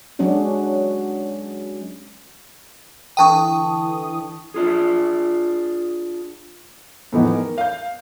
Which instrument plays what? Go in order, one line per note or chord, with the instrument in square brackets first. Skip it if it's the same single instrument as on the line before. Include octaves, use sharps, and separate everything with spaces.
[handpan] F#3 G#3 C#4 D4 F#4
[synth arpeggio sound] D3 E3 D#6 [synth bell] G5 A5 C#6
[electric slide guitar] D4 F4 G#4
[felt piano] E2 A2 E3 F3 B3 D#4
A#4
F5 G6